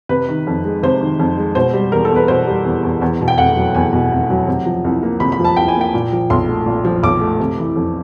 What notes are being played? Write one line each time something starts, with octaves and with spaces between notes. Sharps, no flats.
C3 B4
D#3
F2
G#3
C3 C5
D#3
F2
G#3
B2 C5
G3
E2 A#4
A4
E2 B4
B2 C5
G3
E2
E2
E2
B2
G5
F1 F#5
F#3
E2 G#5
B2
F1
F#3
C3
F3
C2
A#3
C3 B5
B5
F3
A5
C2 G5
G#5
A#3 G5
A#2
F3
B1 C6
A3
A#2
F3
B1 D6
A3
C3
E3
F2